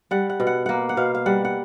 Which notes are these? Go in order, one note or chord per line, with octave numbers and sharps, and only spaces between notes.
G3 F#5
F#5
B2
F#5
A#3 F#5
F#5
B2 F5
F5
G3 F#5
F#5